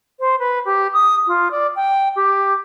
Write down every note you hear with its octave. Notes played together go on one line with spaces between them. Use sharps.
C5
B4
G4
D#6
F4
D5
G5
G4